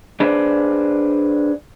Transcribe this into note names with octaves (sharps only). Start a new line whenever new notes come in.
D4 G#4 B4 C5 D5